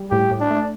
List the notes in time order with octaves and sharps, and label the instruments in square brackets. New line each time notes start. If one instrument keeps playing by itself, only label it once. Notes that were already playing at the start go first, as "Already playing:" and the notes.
Already playing: [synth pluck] G3
[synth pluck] A2 [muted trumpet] G4
[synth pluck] A2
[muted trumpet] D4
[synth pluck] A3